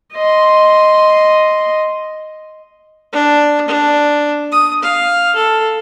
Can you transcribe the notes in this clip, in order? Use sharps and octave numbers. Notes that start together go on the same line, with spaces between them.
D#5 C6
D4
D4
D#6
F5
A4